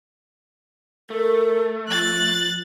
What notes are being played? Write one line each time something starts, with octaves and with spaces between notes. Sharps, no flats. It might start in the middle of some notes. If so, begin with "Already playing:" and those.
A3 A#4
F3 F#6 A6